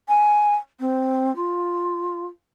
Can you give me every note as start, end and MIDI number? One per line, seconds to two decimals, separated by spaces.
0.08 0.55 80
0.80 1.34 60
1.35 2.25 65